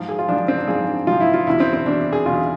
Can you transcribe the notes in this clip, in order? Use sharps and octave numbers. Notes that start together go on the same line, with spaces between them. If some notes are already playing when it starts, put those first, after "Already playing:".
Already playing: G#2 F3
G#4
F4
G#2 F3 D4
D4
C4
D4
G#2 F3 G#4
G#2 F3 F4
E4
F4
E2 B2 E4
C4
C4
E2 B2 D4
G#4
E2 B2 F4